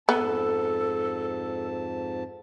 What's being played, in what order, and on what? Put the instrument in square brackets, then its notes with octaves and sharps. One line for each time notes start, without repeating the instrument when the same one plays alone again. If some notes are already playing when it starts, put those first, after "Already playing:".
[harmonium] F2 G#2 A5 [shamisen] B3 [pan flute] A4